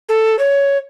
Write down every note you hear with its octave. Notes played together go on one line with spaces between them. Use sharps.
A4
C#5